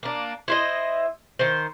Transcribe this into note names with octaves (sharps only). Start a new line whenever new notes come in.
A#3 D4
E4 C5 D#5
D#3 C5